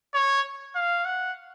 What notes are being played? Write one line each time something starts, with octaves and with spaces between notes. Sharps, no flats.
C#5
F5
F#5